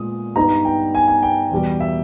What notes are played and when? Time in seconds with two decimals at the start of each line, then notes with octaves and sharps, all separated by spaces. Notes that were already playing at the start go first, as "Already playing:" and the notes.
Already playing: A#2 G#3 B3 D#6
0.36 G2 G3 B3 D#4 A#5
0.65 G5
0.95 G#5
1.08 G#5
1.23 G5
1.51 E2 B2 G3
1.80 E5